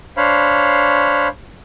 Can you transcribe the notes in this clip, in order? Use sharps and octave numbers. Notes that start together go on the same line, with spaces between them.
D4 C5 C#5 F5 B5